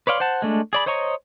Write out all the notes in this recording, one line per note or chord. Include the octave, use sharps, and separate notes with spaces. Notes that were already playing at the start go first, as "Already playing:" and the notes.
B4 C#5 D5 F5 C6
C5 F#5 A5
G#3 A3 D4
G#4 D5 B5
C5 C#5 D#5 A#5 C#6